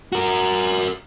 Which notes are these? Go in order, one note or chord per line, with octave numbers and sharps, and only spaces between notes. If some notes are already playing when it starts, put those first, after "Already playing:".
F#4 A#4